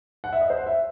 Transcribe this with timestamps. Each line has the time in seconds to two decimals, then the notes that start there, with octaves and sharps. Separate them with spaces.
0.24 F#5
0.33 E5
0.41 D#5
0.50 C5
0.58 F#5
0.66 E5